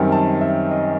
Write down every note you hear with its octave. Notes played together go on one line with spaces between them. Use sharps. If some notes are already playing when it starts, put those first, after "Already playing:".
Already playing: F#2 D#3 G3 C4 D#4
A5
E5
D#5